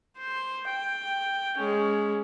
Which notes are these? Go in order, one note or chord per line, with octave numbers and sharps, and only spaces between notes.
C5
G5
G#3 C#4